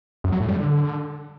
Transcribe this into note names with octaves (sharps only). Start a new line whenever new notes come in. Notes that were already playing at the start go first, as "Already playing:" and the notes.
F#2
F#3
A2
G3
D3